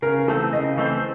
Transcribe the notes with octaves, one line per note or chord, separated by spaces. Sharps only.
C#3 A#4
E3 A3 C4 A4
C#3 D#5
E3 A3 C4